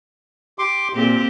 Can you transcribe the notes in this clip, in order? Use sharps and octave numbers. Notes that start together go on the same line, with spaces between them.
G4 C6 D6
A#2 A#3 C4 G4